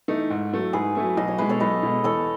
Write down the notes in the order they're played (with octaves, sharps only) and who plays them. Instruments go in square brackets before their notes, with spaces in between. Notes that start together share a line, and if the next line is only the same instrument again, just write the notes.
[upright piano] E3 A3 D#4
G#2
F#3 A3 E4
[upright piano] G#2 [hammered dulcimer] G#4 B4
[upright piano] F#3 A3 E4
[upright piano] B1 [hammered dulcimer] D#5
[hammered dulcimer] C#5
[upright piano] B2 G#3 [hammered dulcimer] B4
[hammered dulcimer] A4 C#5
[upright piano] B1 [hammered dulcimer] B4 D#5
[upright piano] B2 G#3
[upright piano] E2 [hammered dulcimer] A4 C#5